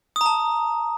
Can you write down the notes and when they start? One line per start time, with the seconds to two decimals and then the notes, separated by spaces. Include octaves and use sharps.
0.16 D#6
0.21 A#5
0.26 A5